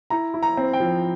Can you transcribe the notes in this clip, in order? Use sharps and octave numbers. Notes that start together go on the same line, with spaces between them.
E4 A#5
E4
A#5
C4
G5
F3